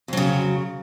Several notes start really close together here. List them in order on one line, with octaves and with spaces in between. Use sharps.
F2 F#3 C#3